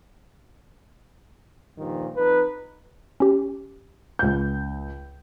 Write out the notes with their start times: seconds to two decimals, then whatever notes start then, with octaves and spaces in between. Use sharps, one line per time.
1.79 G2 A#2 D#3 F3
2.16 F2 D#4 B4
3.20 C#4 G4
4.19 C#2 G6